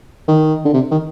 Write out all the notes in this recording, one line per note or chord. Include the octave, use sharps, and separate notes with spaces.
D#3
D3
C3
D#3